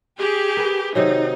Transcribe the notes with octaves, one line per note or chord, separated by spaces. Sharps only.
G4 G#4
A#4 B4
C3 D#3 F#3 D#4